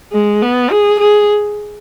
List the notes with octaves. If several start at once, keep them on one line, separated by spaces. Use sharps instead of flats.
G#3
B3
G#4
G#4